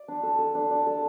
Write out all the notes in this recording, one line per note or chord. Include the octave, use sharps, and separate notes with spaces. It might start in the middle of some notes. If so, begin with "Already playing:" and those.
Already playing: D5
D4
A4
A4
D4
D5
A4